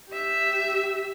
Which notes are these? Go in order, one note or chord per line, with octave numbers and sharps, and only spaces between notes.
G4 E5